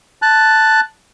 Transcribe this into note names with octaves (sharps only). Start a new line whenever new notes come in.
A5 F#6